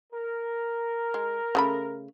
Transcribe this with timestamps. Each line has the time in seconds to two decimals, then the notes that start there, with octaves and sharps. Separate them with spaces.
0.13 A#4
1.14 G#3
1.55 C#3 A3 B5